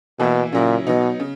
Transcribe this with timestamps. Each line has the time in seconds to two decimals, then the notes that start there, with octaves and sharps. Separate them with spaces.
0.19 B2 E3 A#3 E4
0.53 A#2 C#3 F#3 C#4 E4
0.86 B2 F#3 B3 D#4
1.20 C#3